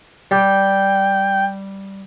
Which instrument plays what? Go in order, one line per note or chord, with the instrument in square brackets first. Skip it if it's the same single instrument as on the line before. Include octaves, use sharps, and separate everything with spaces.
[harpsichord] G3 [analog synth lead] G5